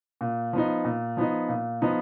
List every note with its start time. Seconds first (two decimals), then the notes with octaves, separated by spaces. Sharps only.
0.21 A#2
0.53 F3 B3 D#4
0.85 A#2
1.17 F3 B3 D#4
1.49 A#2
1.82 F3 B3 D#4